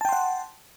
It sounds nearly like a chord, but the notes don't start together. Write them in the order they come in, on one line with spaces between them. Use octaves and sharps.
A5 G5 C6 F#5